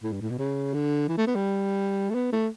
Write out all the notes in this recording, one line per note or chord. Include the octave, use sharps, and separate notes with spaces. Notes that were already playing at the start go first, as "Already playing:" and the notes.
A2
G2
A2
B2
C#3
D3
E3
A3
B3
G3
A3
B3
A3